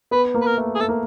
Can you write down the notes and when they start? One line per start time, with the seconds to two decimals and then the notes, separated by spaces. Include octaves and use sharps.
0.11 B3 B4
0.34 A#3
0.41 B4
0.46 A#4
0.58 A3
0.75 G#4
0.80 A3 A4
0.89 A#3